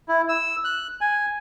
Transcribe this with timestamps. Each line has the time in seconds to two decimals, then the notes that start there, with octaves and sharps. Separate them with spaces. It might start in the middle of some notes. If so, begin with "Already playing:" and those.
0.08 E4
0.29 E6
0.64 F#6
1.01 G#5